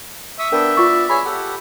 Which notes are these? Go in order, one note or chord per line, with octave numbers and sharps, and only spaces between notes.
E5 C#6 D#6 E6
B3 D4 A#4 G5
B3 F4 D5 C#6
G#4 C#5 G#5 B5
G4 A4 F#5